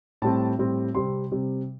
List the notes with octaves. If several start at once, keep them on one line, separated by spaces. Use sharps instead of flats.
A2 G3 C4 A5
A2 G3 C4
C3 G3 C4 C6
C3 G3 C4